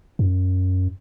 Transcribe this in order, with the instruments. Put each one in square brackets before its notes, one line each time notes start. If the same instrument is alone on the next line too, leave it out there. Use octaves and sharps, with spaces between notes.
[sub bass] F#2